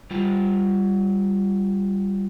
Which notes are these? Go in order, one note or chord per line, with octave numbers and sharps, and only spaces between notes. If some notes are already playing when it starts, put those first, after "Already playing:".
G3 F4